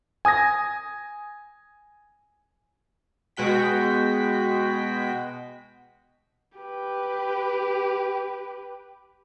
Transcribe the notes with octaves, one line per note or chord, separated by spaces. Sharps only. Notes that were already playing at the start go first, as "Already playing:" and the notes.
G#5 D#6 G#6 A#6
B2 G#3 F#4 G5 B6
G4 B4